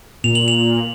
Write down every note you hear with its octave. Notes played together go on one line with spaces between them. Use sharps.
A#2 F7
F#7
F7